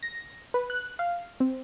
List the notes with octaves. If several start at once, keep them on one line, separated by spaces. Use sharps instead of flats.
A#6
B4
F#6
F5
C4